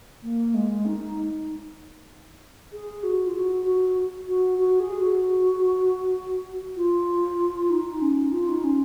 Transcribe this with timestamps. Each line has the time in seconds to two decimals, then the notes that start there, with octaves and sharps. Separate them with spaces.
0.23 A#3
0.54 G#3
0.85 D#4
2.72 G#4
3.03 F#4
3.26 F4
3.34 F#4
3.65 F#4
4.28 F#4
4.58 F#4
4.80 G#4
5.00 F#4
6.76 F4
7.70 D#4
8.01 C#4
8.32 F4
8.48 D#4
8.63 C#4